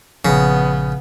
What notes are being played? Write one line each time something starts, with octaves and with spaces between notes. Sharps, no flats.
A#1 C#3 F3 B3